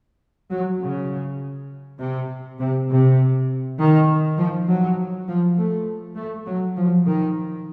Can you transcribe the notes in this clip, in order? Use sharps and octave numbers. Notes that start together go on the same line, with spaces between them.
F#3
C#3
C3
C3
C3
D#3
F3
F#3
F3
A3
A3
F#3
F3
D#3